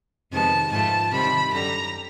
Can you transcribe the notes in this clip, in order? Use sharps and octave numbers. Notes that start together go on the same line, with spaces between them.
F2 C3 D#3 G#3 B3 A5
G#2 F3 A3 A5
C3 D#3 G3 C4 B5
F#2 D3 G3 A#5